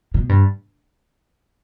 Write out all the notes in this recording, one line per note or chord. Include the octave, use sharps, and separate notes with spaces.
B2
G2